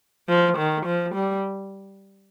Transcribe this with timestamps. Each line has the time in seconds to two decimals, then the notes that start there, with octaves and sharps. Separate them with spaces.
0.28 F3
0.57 D#3
0.86 F3
1.14 G3